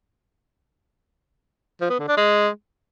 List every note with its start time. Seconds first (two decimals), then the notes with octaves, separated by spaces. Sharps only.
1.81 F3
1.90 B3
1.99 D3
2.08 D4
2.17 G#3